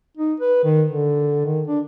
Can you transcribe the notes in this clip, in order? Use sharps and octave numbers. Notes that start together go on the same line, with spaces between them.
D#4
B4
D#3
D3
D#3
D4